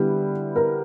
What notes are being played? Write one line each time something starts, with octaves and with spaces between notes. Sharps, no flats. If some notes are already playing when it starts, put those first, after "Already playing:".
Already playing: D3 G3 B3 E4 B4
A#4